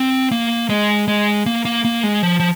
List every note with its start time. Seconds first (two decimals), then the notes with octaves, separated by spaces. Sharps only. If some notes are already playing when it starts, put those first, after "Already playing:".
Already playing: C4
0.31 A#3
0.70 G#3
1.08 G#3
1.46 A#3
1.65 A#3
1.85 A#3
2.03 G#3
2.23 F3
2.40 F3